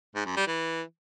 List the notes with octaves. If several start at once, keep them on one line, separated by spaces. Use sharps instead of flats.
G#2
F#2
G3
E3